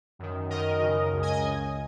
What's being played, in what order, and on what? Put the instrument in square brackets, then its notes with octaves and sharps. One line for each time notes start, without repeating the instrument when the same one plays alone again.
[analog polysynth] F#2 D#3
F#2 D#3 A#4 D#5
F#2 C#3
C#2 C#3
D#5 G#5
D#5 G#5
C#2 C#3